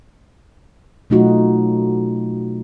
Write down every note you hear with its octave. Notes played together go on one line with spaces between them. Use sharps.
B2 F#3 A3 D#4 F4 F#4